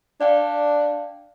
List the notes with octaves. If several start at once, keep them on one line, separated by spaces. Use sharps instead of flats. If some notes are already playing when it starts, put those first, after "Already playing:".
D4 D5 F5 G5